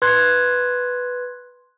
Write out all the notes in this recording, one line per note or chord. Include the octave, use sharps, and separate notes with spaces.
B4 C6 F#6 G#6